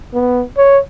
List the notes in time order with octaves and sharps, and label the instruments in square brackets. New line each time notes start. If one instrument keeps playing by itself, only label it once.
[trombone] B3
C#5